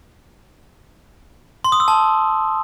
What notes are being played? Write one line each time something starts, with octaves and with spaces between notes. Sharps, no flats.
C6
D#6
E6
A5